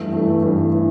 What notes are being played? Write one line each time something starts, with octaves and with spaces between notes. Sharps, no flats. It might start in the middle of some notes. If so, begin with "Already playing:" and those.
Already playing: G2 E3 A3
G2 E3 A3
G2 E3 A3
E3